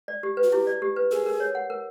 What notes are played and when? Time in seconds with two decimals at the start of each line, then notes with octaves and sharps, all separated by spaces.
0.08 D5
0.23 G4
0.37 B4
0.44 F#4
0.52 E4 G4
0.67 D5
0.82 G4
0.96 B4
1.11 G#4 A#4
1.26 A#4
1.40 C#5
1.55 F#5
1.70 A#4